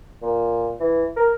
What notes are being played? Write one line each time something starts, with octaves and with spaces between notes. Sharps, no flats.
A#2
E3
A#4